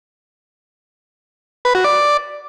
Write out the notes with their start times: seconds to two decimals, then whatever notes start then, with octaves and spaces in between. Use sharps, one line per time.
1.65 B4
1.75 F#4
1.84 D5